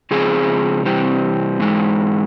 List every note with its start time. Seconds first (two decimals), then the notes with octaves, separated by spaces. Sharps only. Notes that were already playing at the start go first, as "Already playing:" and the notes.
0.11 C#3 F3 G#3 C4 G#4
0.85 C3 E3 G3 C4
1.60 G#2 E3 G#3